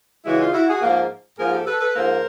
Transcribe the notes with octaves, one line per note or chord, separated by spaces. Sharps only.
C#3 E3 G#3 E4 F#4
D#4 F4
E4 F#4
F#4 G#4
G#2 F3 A#3
G#2 F3 A#3 G#4 A#4
G4 A4
A4 B4
A4 B4
G#2 F3 A#3 A#4 C5